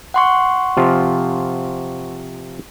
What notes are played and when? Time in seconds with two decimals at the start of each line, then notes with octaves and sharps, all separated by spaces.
0.14 F#5 C6 C#6
0.77 C3 F3 F4